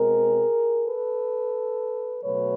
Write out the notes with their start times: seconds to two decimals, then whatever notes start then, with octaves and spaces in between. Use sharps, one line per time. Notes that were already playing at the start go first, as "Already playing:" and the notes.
Already playing: B2 G#3 C4 G#4 A#4
0.86 A4 B4
2.24 B2 F#3 A3 B4 C#5